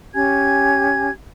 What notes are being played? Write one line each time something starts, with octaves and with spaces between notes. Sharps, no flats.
C#4 G4 G#5 G#6